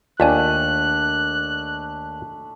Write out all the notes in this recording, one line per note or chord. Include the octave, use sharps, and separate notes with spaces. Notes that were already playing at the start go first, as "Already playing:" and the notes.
D#2 A3 D4 F4 D5 G#5 F#6